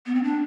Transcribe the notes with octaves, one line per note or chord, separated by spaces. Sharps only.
B3
C4
D4